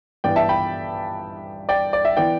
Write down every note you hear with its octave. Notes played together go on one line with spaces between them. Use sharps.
G2 E3 B3 D5 G5
E5 A5
G5 B5
D5 G5
D5
E5
E3 B3 E4 D5 G5